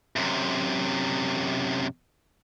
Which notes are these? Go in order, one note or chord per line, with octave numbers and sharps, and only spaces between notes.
F#2 C3